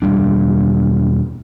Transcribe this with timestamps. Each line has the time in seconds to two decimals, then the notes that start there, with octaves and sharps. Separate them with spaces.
0.02 E1 E2 G3 D4